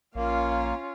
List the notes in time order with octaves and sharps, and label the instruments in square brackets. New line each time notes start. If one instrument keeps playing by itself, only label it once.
[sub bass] A#1 [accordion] A#3 [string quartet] C#4 F4 F5